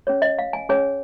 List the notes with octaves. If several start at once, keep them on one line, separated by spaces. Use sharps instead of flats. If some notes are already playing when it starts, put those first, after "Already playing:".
C#4 G#4 C#5
D#5
F5
G#5
C#4 G#4 C#5 G#5